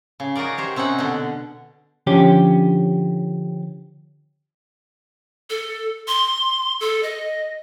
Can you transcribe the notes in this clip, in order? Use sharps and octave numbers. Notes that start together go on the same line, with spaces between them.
C#3
D#4 F#4 G#4 A#4 D5
G4 C5 C#5
C3 C4 C#4 D#4 F#5
B2 D3
D3 F3 C#4 G4
A4
C6
A4
D#5